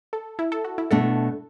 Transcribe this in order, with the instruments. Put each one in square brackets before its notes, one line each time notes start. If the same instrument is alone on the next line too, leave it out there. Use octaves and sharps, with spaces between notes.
[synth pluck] A4
E4
A4
F#4
E4
[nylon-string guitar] B2 A3 D4 [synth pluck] A4